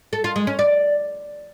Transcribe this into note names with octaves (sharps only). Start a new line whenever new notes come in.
A4
F4
G#3
C#4
D5